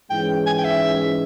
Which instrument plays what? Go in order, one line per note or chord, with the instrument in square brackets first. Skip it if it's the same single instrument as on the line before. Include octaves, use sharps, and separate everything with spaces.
[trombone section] G#2 E3 G#3 C#4 [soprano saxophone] G5
[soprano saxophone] G#5
G5
E5